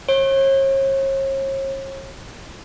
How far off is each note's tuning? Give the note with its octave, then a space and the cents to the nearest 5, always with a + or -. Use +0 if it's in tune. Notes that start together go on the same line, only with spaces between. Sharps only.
C#5 -40